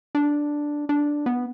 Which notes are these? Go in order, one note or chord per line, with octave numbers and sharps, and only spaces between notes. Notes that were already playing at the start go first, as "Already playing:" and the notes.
D4
D4
B3